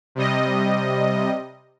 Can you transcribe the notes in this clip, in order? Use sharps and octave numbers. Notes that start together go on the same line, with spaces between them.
C3 G3 D#5